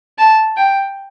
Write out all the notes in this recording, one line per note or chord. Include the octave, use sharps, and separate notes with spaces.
A5
G5